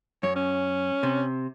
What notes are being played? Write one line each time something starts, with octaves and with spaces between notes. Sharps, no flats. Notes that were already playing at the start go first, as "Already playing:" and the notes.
F#2 C#5
C#4
C3